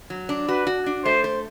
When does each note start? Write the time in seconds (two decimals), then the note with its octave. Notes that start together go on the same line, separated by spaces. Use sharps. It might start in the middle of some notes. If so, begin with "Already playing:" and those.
0.10 F#3
0.29 D4
0.48 F#4 B4
0.67 F#4
0.86 D4
1.05 A3 C5
1.24 C5